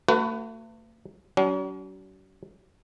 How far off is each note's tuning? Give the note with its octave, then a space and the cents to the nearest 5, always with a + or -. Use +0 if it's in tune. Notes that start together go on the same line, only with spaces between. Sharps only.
A3 +45 F#4 +0 B4 +25
F#3 +40 C#4 +45